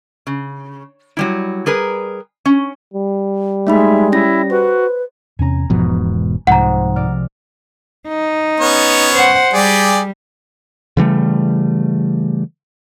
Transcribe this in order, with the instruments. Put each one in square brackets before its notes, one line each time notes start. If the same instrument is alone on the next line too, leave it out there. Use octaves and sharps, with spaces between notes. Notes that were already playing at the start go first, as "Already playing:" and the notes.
[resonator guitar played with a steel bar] C#3
F#3 G3 E4
G3 G#4 A#4 B4
C#4
[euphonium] G3
[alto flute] G#3 [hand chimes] A3 D#4 B5 [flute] E5
[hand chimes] C#4 A#6 [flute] E4
[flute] F#4 [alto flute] B4 [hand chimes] C5
[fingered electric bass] E2 C3 C#4 [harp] G#5 A#5
[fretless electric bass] E1 G#2 B2 [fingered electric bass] F3
[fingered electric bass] C2 [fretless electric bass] G#2 [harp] C3 F3 C4 [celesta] F#5 A#5
[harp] G#3 D5 F6
[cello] D#4
[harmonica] B3 C#4 C#5
[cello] C5 F#5
[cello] G3 [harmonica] G4 G#4 D5
[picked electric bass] C#3 E3 G3 A3